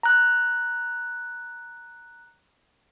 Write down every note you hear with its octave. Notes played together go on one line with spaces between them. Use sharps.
A#5 F#6